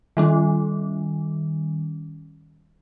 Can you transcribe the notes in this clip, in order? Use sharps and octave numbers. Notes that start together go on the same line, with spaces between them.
D#3 G3 C#4